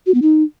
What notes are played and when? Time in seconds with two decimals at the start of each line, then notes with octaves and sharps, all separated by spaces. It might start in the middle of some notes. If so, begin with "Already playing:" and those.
0.06 F#4
0.14 B3
0.22 D#4